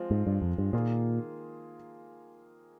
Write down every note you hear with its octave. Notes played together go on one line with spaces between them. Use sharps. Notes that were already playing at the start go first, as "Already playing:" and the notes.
Already playing: F3 G#3 C4 F4
G#2
G2
F2
G2
A#2 D#3 A#3 F4 G#4